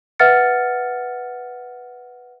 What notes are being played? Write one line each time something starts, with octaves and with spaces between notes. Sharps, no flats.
B4 E5 F#5 F6 A6 C#7